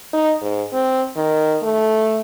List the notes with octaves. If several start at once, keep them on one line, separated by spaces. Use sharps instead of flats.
D#4
G#2
C4
D#3
A3